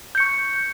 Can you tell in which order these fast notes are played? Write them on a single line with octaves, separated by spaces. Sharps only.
G6 C#7 C#6